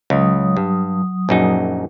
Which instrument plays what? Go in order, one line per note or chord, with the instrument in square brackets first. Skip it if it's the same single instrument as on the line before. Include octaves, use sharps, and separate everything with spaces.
[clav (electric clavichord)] C#2 [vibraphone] F#3 D#6
[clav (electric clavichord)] G2
A#1 F#2 D#4